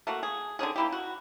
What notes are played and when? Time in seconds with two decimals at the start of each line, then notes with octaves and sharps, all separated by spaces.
0.07 A3 A#3 F#4
0.23 G#4
0.59 D3 D#3 C#4 G#4
0.76 A#3 E4 G4
0.92 F#4